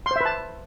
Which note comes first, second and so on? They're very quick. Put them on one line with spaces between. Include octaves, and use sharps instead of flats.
C6 C5 E5 B4 A5